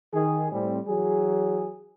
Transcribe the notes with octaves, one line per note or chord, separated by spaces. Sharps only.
D#3 G#4
A2 G3 C4
E3 F#3 G#4